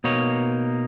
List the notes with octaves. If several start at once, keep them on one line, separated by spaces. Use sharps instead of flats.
B2 A#3 D#4 C#5